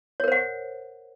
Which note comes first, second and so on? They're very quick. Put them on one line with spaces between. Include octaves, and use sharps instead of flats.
C#5 A#4 C5 F#5